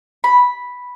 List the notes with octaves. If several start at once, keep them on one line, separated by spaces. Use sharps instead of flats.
B5